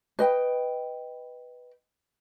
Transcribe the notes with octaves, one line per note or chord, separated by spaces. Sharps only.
B4 D#5 G5